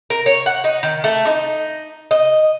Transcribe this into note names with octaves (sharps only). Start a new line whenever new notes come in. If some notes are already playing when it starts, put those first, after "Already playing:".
A#4
C#5
F#5
D#4
D#3
A3
D#4
D#5